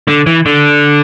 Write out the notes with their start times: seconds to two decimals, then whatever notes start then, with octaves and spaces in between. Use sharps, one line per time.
0.08 D3
0.27 E3
0.46 D3